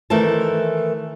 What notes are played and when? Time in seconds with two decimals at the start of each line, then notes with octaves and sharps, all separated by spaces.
0.10 D#3 E3 A3 A#4 C5 A5